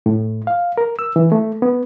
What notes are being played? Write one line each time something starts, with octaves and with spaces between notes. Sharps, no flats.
A2
F5
A#4
E6
E3
A3
B3